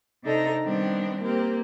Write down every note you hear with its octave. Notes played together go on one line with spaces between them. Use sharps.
C3 D4 D#4 A4 C5 A#5
D#3 G3 B3 C4 D4
A#3 C4 G4